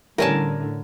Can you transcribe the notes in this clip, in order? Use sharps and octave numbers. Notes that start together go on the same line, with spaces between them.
A2 D3 E3 G3 C#4 A#4 G#5 A5